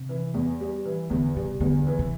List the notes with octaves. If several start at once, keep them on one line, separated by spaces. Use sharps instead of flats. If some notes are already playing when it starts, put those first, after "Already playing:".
Already playing: C3
E3
E2
G3
E3
E2 D3
C3 G3
E2 D3
E3
C3